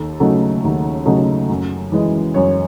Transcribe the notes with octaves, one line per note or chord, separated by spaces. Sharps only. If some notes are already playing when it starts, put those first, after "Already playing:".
Already playing: D#2 A4
C#3 F#3 A3 D#4
D#2
C#3 F#3 A3 D#4
F#2
E3 G#3
F#2 C#5